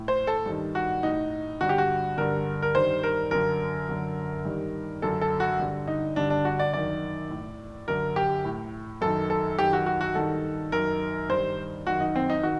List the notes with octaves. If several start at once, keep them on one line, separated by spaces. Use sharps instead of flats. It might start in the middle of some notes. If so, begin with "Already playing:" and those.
Already playing: A2
C5
A4
G2 D#3
F#4
A2 D#4
G2 D3 F#4
G4
F#4
G2 D3 A#4
A#4
G2 D#3 C5
A#4
F#2 D3 A#4
F#2 D3
G2 D#3
F#2 D3 A4
A4
F#4
G2 D3
D#4
G2 D3 D4
D4
F#4
D5
F#2 D#3 D5
A2
F#2 D3 A#4
G4
A2
F#2 D#3 A4
A4
F#2 D#3 G4
F#4
F#4
F#4
G2 D#3 A4
F#2 D#3 A#4
G2 D#3 C5
F#2 D#3 F#4
D#4
C4
D#4
D#3 F#4